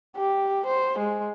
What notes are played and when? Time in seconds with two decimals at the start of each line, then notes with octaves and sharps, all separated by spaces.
0.16 G4
0.66 C5
0.99 G#3